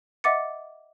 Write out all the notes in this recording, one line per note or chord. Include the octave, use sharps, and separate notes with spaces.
D#5 E5 F#5 D6 A6 C#7